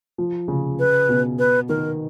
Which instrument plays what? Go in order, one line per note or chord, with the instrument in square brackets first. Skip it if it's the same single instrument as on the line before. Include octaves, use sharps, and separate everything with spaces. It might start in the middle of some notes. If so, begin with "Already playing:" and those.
[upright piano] F3
C#3
[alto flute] B4
[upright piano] B2
[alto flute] B4
[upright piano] D#3 [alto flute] A#4